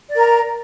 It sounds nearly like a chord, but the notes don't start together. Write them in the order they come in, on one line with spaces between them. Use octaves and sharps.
D5 A#4 A#5